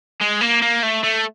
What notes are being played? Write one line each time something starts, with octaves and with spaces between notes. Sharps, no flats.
G#3
A#3
A#3
A3
A3